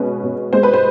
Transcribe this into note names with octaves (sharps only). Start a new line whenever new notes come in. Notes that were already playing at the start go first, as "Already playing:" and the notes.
Already playing: B2 G#3 C#4 B4
B2
G#3 C5
B4
C5